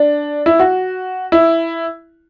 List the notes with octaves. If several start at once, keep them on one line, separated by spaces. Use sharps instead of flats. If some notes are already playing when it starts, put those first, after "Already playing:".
Already playing: D4
E4
F#4
E4